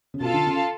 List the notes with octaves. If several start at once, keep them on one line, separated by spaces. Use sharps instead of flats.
C#3
B2 F4 A4 F5 A5
D3
C#3